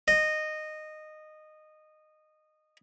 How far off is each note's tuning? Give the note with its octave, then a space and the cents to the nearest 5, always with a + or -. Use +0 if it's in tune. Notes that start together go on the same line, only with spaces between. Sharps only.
D#5 -15